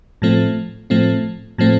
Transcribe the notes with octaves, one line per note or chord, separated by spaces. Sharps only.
A2 F3 A3 C4
A2 F3 A3 C4
A2 F3 A3 C4